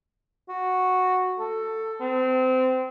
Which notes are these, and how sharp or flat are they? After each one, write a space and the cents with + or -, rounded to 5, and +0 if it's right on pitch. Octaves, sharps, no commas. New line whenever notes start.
F#4 -5
A4 +15
C4 -25